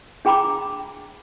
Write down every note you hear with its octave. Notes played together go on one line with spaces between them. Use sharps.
D4 G#4 G5 A#5 B5 D6